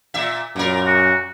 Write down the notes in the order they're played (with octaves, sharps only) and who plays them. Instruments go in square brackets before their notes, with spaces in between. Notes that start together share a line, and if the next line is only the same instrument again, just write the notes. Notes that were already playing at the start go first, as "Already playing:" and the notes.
[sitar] A#2 E5
[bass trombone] F#2 [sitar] A#2 A#4
[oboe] F#4